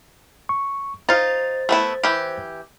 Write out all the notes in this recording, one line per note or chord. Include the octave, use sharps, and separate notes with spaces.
C#6
D#4 F4 C5 A6
A3 B3 E4
E3 G4